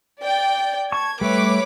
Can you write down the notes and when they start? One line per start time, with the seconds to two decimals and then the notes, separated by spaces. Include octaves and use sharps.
0.19 D5 G5
0.92 A5 C#6 G#6
1.21 G3 A3 B4 C#5 D6